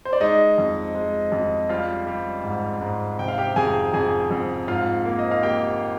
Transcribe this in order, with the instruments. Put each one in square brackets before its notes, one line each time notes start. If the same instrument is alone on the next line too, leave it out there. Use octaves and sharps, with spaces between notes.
[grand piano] C5
D5
G#3 D#4 D#5
F2
G#3
F2
G3 F4 F5
G3
G#2
G#2
C3 G5
F5
G4 G5
F2 G#4 G#5
F2 G#4 G#5
F2
G#2 F4 F5
A#3
D#5
F5
A#3 G4 G5